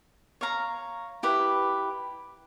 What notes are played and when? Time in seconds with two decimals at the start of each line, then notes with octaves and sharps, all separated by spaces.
0.41 C#5 F5 A#5
1.23 E4 G4 B4